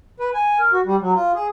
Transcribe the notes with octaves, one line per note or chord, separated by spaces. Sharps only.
B4
G#5
A#4
F#4
G3
F#3
F4
G#4